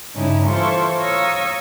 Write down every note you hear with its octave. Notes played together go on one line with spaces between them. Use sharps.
G2 C#3 G3 C#4 D#4 E4
E3 E4 F4 A4 C5 C#6
C#5 F5 A#5 C#6 D#6 E6